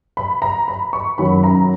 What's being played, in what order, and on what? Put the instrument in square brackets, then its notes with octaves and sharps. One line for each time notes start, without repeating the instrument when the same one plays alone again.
[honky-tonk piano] B5
A#5
B5
C#6
F#2 D#3 F#3 B5
A#5